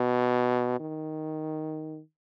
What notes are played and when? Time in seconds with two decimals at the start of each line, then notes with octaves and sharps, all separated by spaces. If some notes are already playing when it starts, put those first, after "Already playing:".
Already playing: B2
0.80 D#3